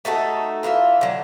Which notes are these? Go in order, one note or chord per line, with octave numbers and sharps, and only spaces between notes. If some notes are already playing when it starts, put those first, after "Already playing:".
A3 D#4 F#4 A4
E3 F4 G#4 E5
D3 F#3